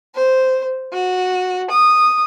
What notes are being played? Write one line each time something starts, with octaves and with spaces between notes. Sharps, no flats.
C5
F#4
D#6